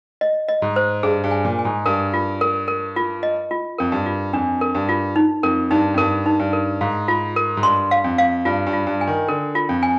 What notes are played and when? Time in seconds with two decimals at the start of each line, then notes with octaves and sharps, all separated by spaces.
0.21 D#5
0.49 D#5
0.62 G#2
0.76 C5
1.03 G2 G#4
1.24 G2
1.31 G#5
1.45 A#2
1.59 G#5
1.65 G#2
1.86 G2 A#4
2.14 F4
2.41 A#4
2.68 A#4
2.96 F4
3.23 D#5
3.51 F4
3.78 F2 A#4
3.92 G2
4.06 F4
4.33 F2 D4
4.61 A#4
4.75 G2
4.89 F4
5.16 D#4
5.43 F2 A#4
5.71 G2 D#4
5.94 F2
5.98 G2 A#4
6.26 D#4
6.39 G2
6.53 A#4
6.81 G#2 F5
7.08 F4
7.36 A#4
7.57 G#2
7.63 G2 C6
7.91 F5
8.04 F2
8.18 F5
8.45 G2 F4
8.67 G2
8.73 F4
8.87 G2
9.01 G#5
9.07 D#3
9.28 D3 A#4
9.55 F4
9.69 F2
9.83 G#5